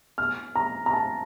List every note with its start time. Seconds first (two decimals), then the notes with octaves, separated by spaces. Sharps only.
0.18 F6
0.56 A#5
0.86 A#5
0.93 A5